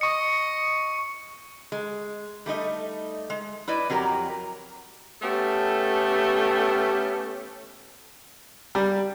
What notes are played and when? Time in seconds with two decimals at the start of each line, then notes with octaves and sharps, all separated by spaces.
0.01 D#5 C#6 C#7
1.72 G#3
2.46 G3 A3 D#4 D#5
3.30 G#3
3.68 E4 B4 D5 D#5
3.90 F2 F#3 G4 A#4 A#5
5.22 A3 B3 C#4 G4 A4
8.75 G3